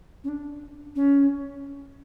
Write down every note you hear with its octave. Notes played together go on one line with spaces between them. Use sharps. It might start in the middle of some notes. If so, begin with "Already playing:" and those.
C#4
D4
C#4